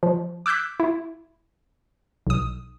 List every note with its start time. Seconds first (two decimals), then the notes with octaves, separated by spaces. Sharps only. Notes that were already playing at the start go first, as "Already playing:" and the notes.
0.03 F3
0.46 D6 E6 F#6 G6 B6
0.80 E4
2.27 B1 D#6